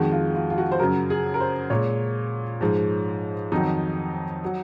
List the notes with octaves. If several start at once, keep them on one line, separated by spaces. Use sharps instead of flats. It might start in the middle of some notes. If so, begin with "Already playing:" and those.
Already playing: F2 D#3 G#3 F#4
F4
F4
F4
F#4
C5
F#2 C#3 F#3 A#4
G#4
A#4
C5
A#2 G#3 C#5
G#2 F3 G#3
F2 D#3 F#3 D#4
F#3